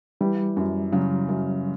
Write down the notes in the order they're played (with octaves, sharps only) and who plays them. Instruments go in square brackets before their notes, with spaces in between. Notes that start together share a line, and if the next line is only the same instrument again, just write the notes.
[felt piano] E3 [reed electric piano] G3
[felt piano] F#2
[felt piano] C#3 [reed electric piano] F#3
[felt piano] F#2